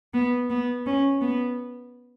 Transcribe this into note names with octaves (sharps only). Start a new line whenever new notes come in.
B3
B3
C#4
B3